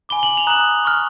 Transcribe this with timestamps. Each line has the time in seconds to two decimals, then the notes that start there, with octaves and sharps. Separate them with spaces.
0.09 G#5 B5 D6 G7
0.23 F#7
0.37 F7
0.47 A#5 D#6 F#6 F#7
0.85 C#6 F6